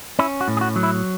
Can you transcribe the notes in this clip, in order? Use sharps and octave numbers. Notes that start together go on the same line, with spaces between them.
C#4 E4
F#4
A2
G#4
F#4
F#3
E4